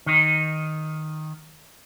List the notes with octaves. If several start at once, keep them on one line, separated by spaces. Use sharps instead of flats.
D#3 D#4